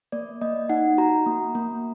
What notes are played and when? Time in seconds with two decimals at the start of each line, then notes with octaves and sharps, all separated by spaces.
0.12 A#3 D5
0.41 A#3 D#5
0.69 D#4 F#5
0.98 F#4 A#5
1.26 A#3
1.55 A#3